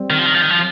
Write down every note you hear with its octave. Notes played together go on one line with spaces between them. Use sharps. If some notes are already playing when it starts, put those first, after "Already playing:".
Already playing: G3 C4
D#3
F3
D#3
F3
D#3
F3